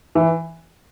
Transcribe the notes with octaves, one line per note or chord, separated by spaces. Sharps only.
E3